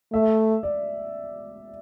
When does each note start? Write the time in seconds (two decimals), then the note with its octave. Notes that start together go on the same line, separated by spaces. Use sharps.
0.13 A3 E5
0.63 D5